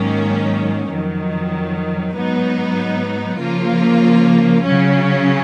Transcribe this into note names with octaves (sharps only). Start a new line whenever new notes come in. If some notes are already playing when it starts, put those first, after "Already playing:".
Already playing: G#2 D#3 F#3 A#3 C#4
F2 D#3 F#3
G#2 F#3 B3 D#4
C#3 F3 A#3 F4
C#3 F#3 C#4